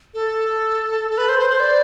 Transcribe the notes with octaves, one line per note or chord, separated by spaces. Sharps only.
A4
A4
B4
C5
C5
C5
D5